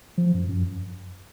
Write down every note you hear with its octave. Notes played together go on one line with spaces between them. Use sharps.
F3
F#2
F#2